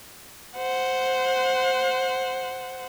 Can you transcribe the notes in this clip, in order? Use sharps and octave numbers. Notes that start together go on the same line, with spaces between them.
C5 F#5